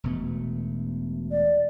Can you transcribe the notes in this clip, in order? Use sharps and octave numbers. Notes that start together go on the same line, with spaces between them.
E1 B2 A3
D5